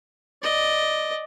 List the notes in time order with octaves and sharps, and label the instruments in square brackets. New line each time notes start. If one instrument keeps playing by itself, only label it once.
[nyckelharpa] D5 D#5